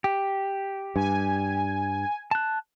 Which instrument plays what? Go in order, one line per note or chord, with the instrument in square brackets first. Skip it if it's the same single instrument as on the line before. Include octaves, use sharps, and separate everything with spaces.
[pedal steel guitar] G4
[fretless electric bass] G2 [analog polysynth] G#5
[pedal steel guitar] A5 F#6